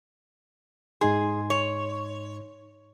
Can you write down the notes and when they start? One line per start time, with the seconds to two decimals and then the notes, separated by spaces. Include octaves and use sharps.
1.01 G#2 D#4 G#4 C6
1.50 C#5